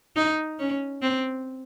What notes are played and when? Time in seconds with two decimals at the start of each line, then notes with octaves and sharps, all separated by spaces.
0.16 D#4
0.59 C#4
1.02 C4